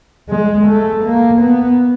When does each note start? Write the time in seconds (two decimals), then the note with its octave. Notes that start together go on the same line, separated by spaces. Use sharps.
0.29 G#3
0.67 A3
1.04 A#3
1.42 B3